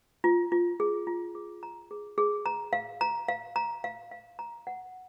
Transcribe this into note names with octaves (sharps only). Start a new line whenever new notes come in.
F4
F4
G#4
F4
G#4
A#5
G#4
G#4
A#5
F5
A#5
F5
A#5
F5
F5
A#5
F#5